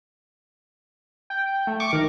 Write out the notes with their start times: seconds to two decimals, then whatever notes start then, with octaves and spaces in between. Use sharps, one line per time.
1.30 G5
1.67 A3
1.80 C#6 D6
1.93 D#3 A#4